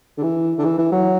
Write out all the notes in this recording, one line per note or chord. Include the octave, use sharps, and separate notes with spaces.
D3
E3
D3
E3
E3
F#3